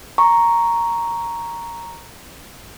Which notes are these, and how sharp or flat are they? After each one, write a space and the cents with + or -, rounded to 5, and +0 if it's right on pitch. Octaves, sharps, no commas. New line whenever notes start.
A#5 +0 C#6 +0